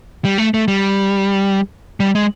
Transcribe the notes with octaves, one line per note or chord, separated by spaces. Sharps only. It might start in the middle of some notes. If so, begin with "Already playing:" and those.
G3
A3
A3
G3
G3
G#3